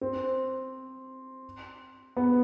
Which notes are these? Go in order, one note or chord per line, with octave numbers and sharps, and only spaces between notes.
C4
B3